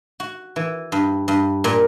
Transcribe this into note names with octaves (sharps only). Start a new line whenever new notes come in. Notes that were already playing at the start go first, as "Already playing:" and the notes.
F#4
E3
G2
G2
A#2